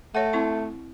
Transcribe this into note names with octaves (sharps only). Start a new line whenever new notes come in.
A3 C#5 F#5
C4 E4 C#6